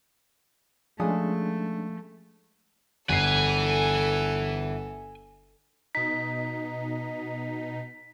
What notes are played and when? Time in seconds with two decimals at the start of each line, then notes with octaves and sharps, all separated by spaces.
1.00 F3 G#3 A3 C#4 D4 G#4
3.09 G1 E4 A4 B4 G#5 C7
5.95 B2 D#4 B6